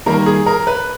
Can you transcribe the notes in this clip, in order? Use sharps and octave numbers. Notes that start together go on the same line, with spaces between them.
D#3 G3 A#3 A#4
G#4
A#4
B4